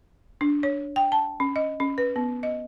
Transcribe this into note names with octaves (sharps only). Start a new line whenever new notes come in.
D4
C#5
G5
A5
C#4
D#5
C#4
B4
B3
D#5